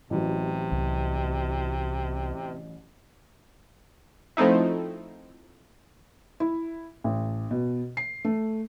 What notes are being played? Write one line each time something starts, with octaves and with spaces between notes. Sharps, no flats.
A1 C3 E3 F#3
C2
F3 A3 C4 D#4 E4
E4
A1
B2
C7
A3